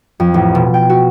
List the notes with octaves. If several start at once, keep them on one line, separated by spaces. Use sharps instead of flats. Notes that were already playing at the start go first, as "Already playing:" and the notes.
F2
A1
B2
G5
F#4